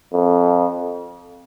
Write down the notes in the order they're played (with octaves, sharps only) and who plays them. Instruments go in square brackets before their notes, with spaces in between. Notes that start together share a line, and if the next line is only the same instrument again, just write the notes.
[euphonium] F2